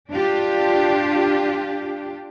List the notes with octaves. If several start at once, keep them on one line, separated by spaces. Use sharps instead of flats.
D4 F4 G4